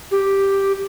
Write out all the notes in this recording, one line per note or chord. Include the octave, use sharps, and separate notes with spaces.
G4